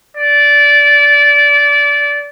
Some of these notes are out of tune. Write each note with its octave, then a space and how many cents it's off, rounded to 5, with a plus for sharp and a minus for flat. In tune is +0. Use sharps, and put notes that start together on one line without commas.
D5 -20